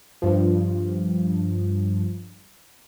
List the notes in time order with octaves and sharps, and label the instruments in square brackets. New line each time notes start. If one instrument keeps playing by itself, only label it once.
[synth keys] G2 F3